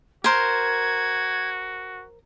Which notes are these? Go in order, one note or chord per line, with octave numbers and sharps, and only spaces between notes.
F#4 A#4 C5 G#6